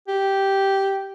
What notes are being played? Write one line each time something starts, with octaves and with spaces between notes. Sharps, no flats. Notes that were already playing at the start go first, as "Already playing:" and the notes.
G4